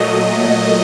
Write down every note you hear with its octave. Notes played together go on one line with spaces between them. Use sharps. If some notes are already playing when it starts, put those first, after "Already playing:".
Already playing: A#2 F#3 A3 D#5